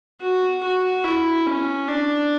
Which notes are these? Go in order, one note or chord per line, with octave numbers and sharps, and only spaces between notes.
F#4
F#4
E4
C#4
D4